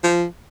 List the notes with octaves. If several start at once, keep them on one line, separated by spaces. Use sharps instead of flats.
F3